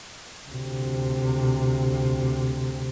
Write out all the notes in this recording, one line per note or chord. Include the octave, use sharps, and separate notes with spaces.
D2 C3